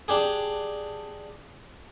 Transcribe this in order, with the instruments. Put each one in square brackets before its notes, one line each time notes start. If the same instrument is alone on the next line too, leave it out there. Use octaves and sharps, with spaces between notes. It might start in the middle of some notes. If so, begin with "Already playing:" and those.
[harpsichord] D4 G4 G#4